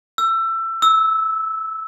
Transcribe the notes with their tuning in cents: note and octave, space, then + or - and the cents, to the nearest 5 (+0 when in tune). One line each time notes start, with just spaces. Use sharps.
E6 +20
E6 -15